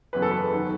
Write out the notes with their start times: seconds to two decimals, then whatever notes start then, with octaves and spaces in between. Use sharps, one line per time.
0.13 F#1 E2 C#3 F#3 B4
0.22 A4
0.31 B4
0.53 D#3 F#3